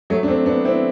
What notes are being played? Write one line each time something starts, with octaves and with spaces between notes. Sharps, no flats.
F#3 A3
D4
A3 C4
B3 D4
C4 E4